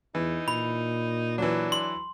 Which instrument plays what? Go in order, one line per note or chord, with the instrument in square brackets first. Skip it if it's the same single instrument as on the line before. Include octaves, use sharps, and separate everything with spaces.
[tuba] E2 [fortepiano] E3 [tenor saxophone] D#4
[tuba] A#2 [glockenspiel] B5
[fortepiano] E3 F#3 [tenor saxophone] D4
[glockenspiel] C6